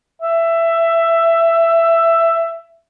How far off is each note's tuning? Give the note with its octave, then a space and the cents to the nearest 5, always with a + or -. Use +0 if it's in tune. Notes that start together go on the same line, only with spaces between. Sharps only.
E5 +15